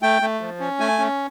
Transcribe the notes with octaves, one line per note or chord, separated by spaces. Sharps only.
A3 G5
A3
F3
C#4
A3 G#5
C#4